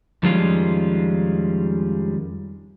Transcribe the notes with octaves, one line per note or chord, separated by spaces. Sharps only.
F2 D#3 G3 G#3 C#4 F4